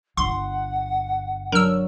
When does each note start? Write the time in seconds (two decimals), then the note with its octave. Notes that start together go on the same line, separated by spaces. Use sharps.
0.17 G1 F#5 C6
1.52 F#3 D4 A#4 E6